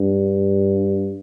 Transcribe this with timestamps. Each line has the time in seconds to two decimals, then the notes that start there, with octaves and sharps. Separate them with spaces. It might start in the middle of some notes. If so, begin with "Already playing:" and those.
Already playing: G2